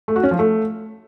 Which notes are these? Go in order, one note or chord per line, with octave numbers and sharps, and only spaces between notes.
A3
F#4
C#4
F3
A3